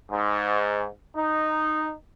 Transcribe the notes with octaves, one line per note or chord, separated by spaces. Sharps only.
G#2
D#4